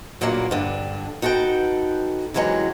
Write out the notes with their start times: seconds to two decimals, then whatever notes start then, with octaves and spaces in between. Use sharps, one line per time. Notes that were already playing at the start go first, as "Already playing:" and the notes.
0.21 G2 A#2 C#3 F#3 A#3
0.51 G2 D3
1.22 D#4 F#4 A4 B4 G5
2.34 C3 E3 F#3 G#3 C#4